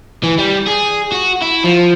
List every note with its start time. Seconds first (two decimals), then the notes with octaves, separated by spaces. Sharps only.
0.23 E3
0.39 G3
0.67 G#4
1.12 F#4
1.42 E4
1.64 F3